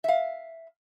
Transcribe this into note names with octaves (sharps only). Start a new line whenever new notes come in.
E5 F5